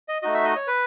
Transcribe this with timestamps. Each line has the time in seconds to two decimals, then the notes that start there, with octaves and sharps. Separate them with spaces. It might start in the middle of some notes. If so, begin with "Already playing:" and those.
0.08 D#5
0.22 A3 D#4 F#4 D#5
0.34 E5
0.45 D#5
0.56 C#5
0.67 B4